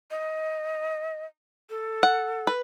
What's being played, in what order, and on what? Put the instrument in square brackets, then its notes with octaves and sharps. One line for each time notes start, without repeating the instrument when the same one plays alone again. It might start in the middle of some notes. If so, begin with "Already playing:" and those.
[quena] D#5
A4
[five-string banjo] F#5
B4